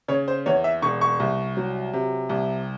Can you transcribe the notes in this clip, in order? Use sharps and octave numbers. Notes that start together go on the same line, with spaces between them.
C#3 C#5
C5
E2 C#5
E5
E1 C#6
C#6
C2
F#3
C3
C2